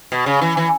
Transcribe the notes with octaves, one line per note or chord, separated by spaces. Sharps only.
B2
C#3
E3
E3